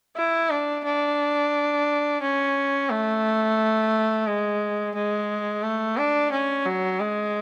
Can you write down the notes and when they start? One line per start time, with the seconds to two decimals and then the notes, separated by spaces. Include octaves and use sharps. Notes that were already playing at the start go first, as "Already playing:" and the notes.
0.17 E4
0.51 D4
0.85 D4
2.22 C#4
2.90 A3
4.27 G#3
4.95 G#3
5.63 A3
5.98 D4
6.32 C#4
6.66 F#3
7.00 G#3